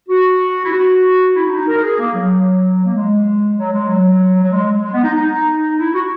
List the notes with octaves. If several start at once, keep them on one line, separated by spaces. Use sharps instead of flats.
F#4
E4
F#4
E4
D#4
D#4
A#4
G#4
A#3
F#3
A#3
G#3
F#3
G#3
F#3
F#3
G#3
G#3
B3
D#4
D#4
E4
F#4